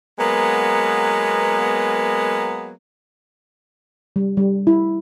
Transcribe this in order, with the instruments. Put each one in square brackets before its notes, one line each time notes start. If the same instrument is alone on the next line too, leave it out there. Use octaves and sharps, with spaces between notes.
[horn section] F#3 G#3 A#3 B3
[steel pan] G3
G3
E4